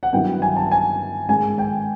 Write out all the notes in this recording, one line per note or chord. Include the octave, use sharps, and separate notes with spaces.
F#5
G2 D#3 F#3 B3 E4 G5
G#5
A5
G#5
G#2 D#3 G#3 G#5
G5